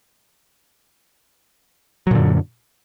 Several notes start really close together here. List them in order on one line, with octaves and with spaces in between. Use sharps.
F#3 A#2 D3 F#2